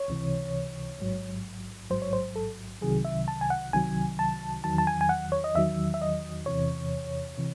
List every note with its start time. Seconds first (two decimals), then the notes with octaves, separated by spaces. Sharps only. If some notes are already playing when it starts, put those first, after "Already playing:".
Already playing: C#5
0.08 C#2 C3 E3
0.99 A1 G#2 F#3
1.90 A1 G#2 F#3 C5
2.02 C#5
2.13 C5
2.36 A4
2.81 C2 C3 D#3 F#3 G#4
3.05 E5
3.28 A5
3.41 G#5
3.50 F#5
3.73 C2 C3 D#3 F#3 G#5
4.19 A5
4.64 E2 D#3 F#3 A5
4.78 A5
4.87 G#5
5.01 G#5
5.09 F#5
5.32 C#5
5.44 D#5
5.55 E2 D#3 F#3 E5
5.94 E5
6.02 D#5
6.46 E2 C3 E3 C#5
7.38 C3 E3